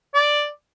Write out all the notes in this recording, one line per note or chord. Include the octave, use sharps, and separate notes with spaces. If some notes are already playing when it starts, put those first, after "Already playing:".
D5